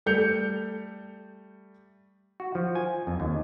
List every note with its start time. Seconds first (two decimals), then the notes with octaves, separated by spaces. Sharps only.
0.06 G3 A3 G6 C#7 F7
2.40 F#4
2.55 F3
2.75 G#5
3.07 F2
3.20 D#2